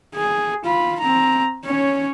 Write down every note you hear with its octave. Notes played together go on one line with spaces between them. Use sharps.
G#4
F4 B5
C4 A#5
C#4 C#5